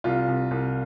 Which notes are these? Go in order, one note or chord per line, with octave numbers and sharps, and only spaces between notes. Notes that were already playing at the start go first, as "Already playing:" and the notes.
C2 F4
C2
C2